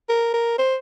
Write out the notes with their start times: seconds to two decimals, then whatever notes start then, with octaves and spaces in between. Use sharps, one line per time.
0.09 A#4
0.34 A#4
0.58 C5